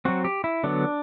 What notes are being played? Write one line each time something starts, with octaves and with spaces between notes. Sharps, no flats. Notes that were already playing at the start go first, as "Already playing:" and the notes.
F#3 C4 F#4
G4
E4
D3 F#3 B3 D4